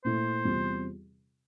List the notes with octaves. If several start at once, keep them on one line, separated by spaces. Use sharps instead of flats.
A#2 A3 E4 C5
E2 C3 G3 C4 F4